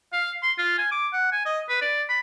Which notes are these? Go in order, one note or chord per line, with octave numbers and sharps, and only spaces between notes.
F5
C6
F4
G#5
D6
F#5
G#5
D#5
B4
D5
B5